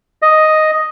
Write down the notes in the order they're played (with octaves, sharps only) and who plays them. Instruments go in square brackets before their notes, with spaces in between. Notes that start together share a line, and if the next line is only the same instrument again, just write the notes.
[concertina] D#5